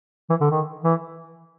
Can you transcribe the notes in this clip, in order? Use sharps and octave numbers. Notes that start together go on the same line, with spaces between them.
E3
D3
D#3
E3